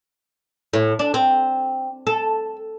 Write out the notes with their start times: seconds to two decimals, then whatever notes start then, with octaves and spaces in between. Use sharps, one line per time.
0.73 A2
0.99 D4
1.14 C4
2.07 A4